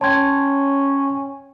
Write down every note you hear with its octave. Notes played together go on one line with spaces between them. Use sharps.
C#4 C#5 G5 A5 C6 G#6